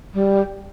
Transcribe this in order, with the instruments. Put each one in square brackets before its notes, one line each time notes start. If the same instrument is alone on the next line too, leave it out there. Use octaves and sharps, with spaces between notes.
[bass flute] G3